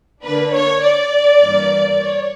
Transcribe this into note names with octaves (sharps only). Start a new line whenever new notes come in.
D3 A#3 D4 B4
C#5
D5
G2 E3 A#3
C#5